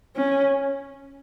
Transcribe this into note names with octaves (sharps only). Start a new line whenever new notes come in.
C#4